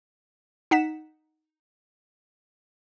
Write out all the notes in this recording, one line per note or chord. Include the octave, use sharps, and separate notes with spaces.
D#4 F#5 B6 E7